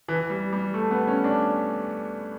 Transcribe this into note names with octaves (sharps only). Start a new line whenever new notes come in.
E3
G3
G3
A3
B3
C#4
D4